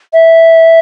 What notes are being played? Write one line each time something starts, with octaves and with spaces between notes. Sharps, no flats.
E5